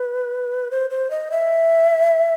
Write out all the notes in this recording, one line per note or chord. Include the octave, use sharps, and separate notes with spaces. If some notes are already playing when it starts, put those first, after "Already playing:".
Already playing: B4
C5
C5
D#5
E5